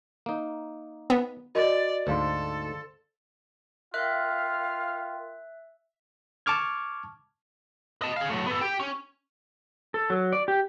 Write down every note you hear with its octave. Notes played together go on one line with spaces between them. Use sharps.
A#3 D#4
B3
F#4 A#4 D5 D#5
D2 G#2 A4 C5 F5 C6
F4 A#4 E5 F5 G5 F#6
A5 C#6 D6 F6 G#6
D#5 A5
G#4 F5
F#3 A3
B3 A4
G4 G5
C#4
A4
F#3
D5
G4